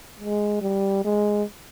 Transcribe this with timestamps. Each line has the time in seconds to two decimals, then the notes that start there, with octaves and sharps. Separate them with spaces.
0.19 G#3
0.61 G3
1.05 G#3